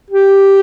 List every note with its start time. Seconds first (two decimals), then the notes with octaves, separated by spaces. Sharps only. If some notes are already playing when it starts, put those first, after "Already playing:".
0.10 G4